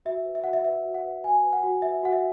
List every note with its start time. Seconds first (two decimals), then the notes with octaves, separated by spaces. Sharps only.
0.05 F#4 E5
0.25 B4
0.35 E5
0.44 F#4 F#5
0.53 E5
0.64 B4 E5
0.85 F#4
0.94 F#5
1.04 B4
1.23 F#4 G#5
1.43 B4
1.53 F#5
1.63 F#4
1.82 B4 E5
2.03 F#4 F#5
2.13 E5